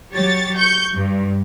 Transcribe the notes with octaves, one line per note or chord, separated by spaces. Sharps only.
F#3 G4 C#5 A6
C#6 G6
G2